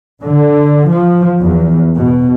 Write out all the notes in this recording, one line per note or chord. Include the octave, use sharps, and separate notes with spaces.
D3
F3
E2
B2